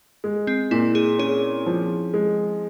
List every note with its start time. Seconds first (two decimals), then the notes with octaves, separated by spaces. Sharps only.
0.24 G#3
0.47 C4
0.71 A#2 E4
0.95 G#4
1.19 C#4 G#4
1.66 F3
2.14 G#3